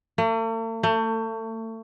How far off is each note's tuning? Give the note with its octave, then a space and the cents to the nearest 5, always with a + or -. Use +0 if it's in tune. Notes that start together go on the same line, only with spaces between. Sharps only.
A3 +45
A3 +30